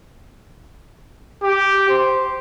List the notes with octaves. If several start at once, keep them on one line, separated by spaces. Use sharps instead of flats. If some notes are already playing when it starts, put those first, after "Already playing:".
G4
C5